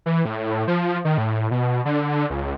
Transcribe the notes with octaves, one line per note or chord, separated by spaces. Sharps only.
E3
A2
F3
D#3
A2
B2
D3
C#2